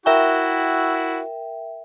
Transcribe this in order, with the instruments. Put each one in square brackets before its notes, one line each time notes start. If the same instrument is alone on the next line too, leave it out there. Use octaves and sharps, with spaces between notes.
[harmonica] E4 F#4 [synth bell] A#4 E5 G5